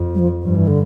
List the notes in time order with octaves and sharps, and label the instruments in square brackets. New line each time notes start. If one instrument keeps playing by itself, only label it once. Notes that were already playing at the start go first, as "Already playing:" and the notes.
Already playing: [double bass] F2
[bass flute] G3
F3
[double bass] G2 [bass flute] F3
[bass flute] E3
D3